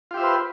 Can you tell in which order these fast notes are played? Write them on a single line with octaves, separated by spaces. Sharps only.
F4 G4 E5 C5 B4